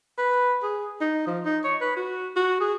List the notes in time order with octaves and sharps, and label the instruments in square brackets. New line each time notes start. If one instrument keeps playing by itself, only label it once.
[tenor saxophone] B4
G#4
D#4
F3
D#4
C#5
B4
F#4
F#4
G#4